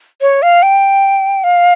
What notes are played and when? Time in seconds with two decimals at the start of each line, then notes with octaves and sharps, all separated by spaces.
0.21 C#5
0.42 F5
0.63 G5
1.44 F5